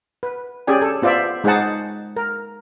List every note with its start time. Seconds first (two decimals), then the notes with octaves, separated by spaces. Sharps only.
0.23 B4
0.67 C#4 G4 G#4 D5 G#5
0.82 A4
1.02 B3 F4 C5 D5 E5
1.44 G#3 D#4 G#4 C5 F#5 A5
2.17 A#4